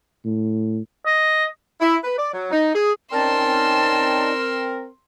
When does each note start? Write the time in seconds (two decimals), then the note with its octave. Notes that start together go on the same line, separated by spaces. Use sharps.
0.25 A2
1.06 D#5
1.80 E4
2.04 B4
2.18 D5
2.33 F#3
2.51 D#4
2.75 G#4
3.13 C4 C#4 D#4 A#4 D5 A5 C6 E6